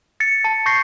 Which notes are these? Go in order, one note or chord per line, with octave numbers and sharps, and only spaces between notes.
A6 C#7
A5
C#6 G6 A#6 C7